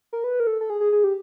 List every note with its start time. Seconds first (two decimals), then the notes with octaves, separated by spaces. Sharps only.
0.13 A#4
0.24 B4
0.40 A#4
0.47 A4
0.61 A4
0.70 G#4
0.81 G#4
0.92 G#4
1.04 G4